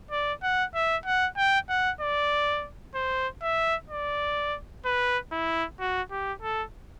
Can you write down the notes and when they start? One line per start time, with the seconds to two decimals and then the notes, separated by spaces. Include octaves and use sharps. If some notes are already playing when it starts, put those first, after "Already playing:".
0.11 D5
0.43 F#5
0.75 E5
1.06 F#5
1.37 G5
1.70 F#5
2.01 D5
2.95 C5
3.42 E5
3.90 D5
4.85 B4
5.32 E4
5.80 F#4
6.11 G4
6.42 A4